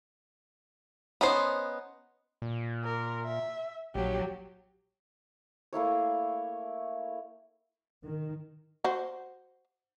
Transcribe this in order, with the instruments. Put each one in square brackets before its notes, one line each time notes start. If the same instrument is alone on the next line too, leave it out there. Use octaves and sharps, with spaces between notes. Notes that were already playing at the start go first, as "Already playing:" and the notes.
[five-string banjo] B3 C#4 D#4 C5
[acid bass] A#2
[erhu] A#4
E5
[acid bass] A#1 [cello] F#3 [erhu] G4
[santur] A3 A#3 E4 C#5
[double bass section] D#3
[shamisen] F#4 C5